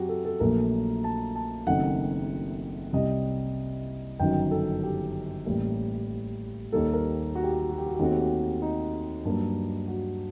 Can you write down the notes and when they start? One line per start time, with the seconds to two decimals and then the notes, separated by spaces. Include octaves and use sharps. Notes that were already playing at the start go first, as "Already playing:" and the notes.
Already playing: F#2 F#3 C4 F#4 G4
0.09 A4
0.25 A4
0.40 A#1 A#2 F#3 A3 A#4
1.04 A5
1.36 A5
1.66 F#1 F#2 D#3 A3 C4 F#5
2.93 C2 C3 G3 C4 D#5
4.20 G1 F#2 D#3 F#3 G5
4.51 A4
4.83 G4
5.46 A1 A2 G3 A#3
6.72 D#2 D#3 G3 A#3 A4
6.93 A#4
7.35 F#4
7.44 G4
7.52 F#4
7.61 G4
7.69 F#4
7.78 G4
7.87 F#4
7.95 G4
7.99 D#2 D#3 A3 C4 F#4
8.12 G4
8.20 F#4
8.62 D#4
9.25 G2 F#3 A#3
9.88 F#4